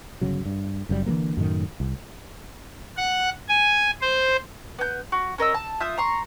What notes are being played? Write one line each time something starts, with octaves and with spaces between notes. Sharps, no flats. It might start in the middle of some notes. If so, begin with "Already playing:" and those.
G1 C#3 F#3
G2
F#1 F#2 C#3 G3
D3 E3 F#3 A#3
F#2 A2 D#3
C2
F#5
G#5
C5
B3 G6
F#4
C#4 A#4 D#5 E6
A5
F4 E5 D#6 G6
A#5 C6 C#6